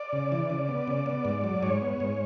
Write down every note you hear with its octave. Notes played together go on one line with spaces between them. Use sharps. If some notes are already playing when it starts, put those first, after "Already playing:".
Already playing: D5
C#3
E3
C#3
B3
C#3
B3
G#2
F#3
G#2 C#5
B3
G#2